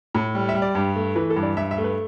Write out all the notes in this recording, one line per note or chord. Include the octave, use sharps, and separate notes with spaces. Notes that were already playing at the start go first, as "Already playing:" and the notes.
A2
G3
E5
G3
D5
G2
A3
E3 B4
A4
G2
D5
G2 E5
E5
A3
B4